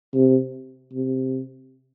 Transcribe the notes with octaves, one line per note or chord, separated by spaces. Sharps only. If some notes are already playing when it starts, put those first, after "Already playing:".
C3
C3